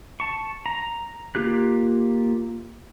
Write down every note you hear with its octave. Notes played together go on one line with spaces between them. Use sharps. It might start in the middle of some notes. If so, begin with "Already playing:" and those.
A5 C#6
A#5
A#3 F4 G4 F#6